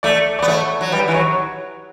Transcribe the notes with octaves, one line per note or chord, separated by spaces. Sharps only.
A3 D5
B3 D5
A3 C#5
F#3
G3 B4
E3
F#3 C#5